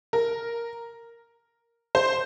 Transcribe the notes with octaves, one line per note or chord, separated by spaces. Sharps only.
A#4
C5